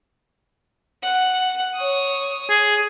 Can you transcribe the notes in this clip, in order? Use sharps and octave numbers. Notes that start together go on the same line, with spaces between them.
F#5
C#5 D#6
G#4